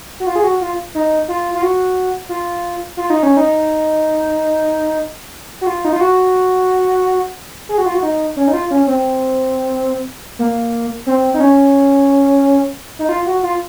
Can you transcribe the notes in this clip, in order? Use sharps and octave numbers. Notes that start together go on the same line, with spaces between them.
F#4
F4
G#4
F#4
F4
D#4
F4
F4
F#4
F4
F4
D#4
C#4
D#4
F#4
F4
D#4
F4
F#4
G#4
F#4
F4
F#4
D#4
C#4
D#4
F4
C#4
C4
A#3
C4
D#4
C#4
D#4
F4
F#4
F4